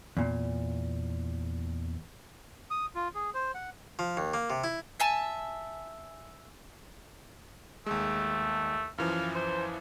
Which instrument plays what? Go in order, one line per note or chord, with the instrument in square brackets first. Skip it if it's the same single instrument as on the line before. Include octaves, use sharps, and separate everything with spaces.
[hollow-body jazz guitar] E2 A#2
[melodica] D#6
F4
G#4
C5
F#5
[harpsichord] F3
D#2
A#3
C3
E4
[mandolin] E5 G#5 A5
[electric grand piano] D#2 G#3 [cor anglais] A3
[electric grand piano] F#2 E3 F3 [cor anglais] F5
[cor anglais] C5